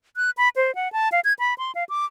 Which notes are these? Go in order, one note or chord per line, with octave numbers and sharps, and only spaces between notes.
F#6
B5
C5
F#5
A5
F5
G#6
B5
C6
F5
D6